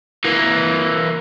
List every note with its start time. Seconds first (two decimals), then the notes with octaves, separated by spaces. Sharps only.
0.25 E3 A#3